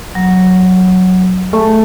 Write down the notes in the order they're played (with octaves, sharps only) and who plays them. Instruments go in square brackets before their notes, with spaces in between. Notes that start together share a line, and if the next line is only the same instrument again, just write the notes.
[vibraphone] F#3
[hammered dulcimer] A3